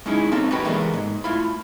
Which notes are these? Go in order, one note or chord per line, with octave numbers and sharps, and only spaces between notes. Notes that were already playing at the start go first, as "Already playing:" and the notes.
G#3 C#4 D#4 E4 G#4
A#3 C4 C#4 D#4 F#4 A4
F#4 G4 B4 C#5 G5 B5
E3 G#3 A#3 B3 D4 A4
G#2
A3 E4 F4 B5